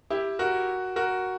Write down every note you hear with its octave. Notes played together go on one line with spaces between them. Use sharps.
E4 G4
F#4 A#4
F#4 A#4